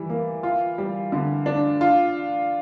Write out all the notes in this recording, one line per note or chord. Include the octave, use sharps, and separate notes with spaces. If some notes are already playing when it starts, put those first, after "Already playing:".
Already playing: E3 G3
A#3
F4
G3
D3
D4
F4